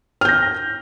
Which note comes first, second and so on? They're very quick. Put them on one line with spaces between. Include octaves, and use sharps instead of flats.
F6 G6 A#6